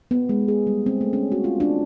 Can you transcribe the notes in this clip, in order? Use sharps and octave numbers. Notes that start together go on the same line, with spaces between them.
B3
G#3
G#4
G3
C4
A3
C#4
F#4
F4
D4